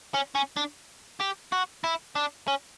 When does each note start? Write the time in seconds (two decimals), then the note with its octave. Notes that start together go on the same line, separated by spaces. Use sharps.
0.14 C#4
0.35 C#4
0.57 D4
1.21 G4
1.52 F#4
1.84 E4
2.16 D4
2.48 C#4